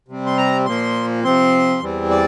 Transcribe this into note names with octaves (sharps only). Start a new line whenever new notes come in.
C3 G3 C4
C6
A#5
A#2 F3 A#3 C6
C3 F3 C4 C6
E2 E3 G3 C4
D5